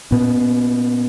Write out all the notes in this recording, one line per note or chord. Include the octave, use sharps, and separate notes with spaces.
A#2 B3 C#4